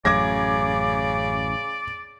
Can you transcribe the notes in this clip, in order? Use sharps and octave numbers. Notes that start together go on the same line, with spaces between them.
A1 F#2 C#3 D5 D6 G#6 A#6